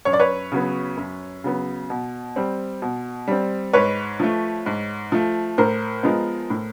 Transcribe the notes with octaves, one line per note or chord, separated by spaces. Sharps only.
F#2 C#5
D5
B4 C#5
C#3 F#3 B3
F#2
C#3 F#3 B3
B2
G3 C4
B2
G3 C4
G#2 B4 C#5
F3 A3
G#2
F3 A3
A2 A#4 C5
F3 G#3 B3
A2